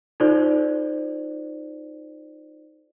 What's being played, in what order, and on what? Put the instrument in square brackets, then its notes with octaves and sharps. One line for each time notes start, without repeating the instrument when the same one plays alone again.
[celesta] D#4 F4 A4 C5 D5